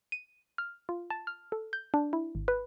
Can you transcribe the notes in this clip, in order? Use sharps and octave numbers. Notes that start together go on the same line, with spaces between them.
D#7
F6
F4
A5
F6
A4
G6
D4
E4
G#1
B4